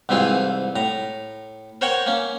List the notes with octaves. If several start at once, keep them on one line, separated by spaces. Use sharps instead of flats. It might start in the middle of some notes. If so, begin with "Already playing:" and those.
C2 G#2 E3 C4 F4 G#4
A2 A#5
A#4 C5 C#5 F#5 G5 C#6
A#3 C#4